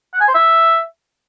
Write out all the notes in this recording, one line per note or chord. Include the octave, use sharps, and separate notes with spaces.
F#5
G#5
C5
E5